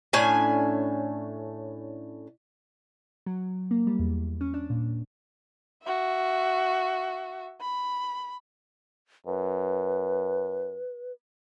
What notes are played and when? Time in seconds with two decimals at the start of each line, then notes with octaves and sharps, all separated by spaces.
0.13 A2 C#4 D4 G#5
3.26 F#3
3.71 A#3
3.87 G3
3.99 E2
4.41 C#4
4.54 D4
4.70 A#2
5.83 F#4 E5
7.61 B5
9.27 F#2 B4